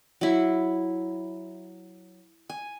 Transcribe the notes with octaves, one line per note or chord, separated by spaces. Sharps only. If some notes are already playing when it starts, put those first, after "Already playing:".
F#3 E4
G#5